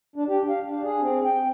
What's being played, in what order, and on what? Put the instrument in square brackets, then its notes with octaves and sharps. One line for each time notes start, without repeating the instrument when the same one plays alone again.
[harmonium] D4
G4
F5
D4
G#4
C4
G5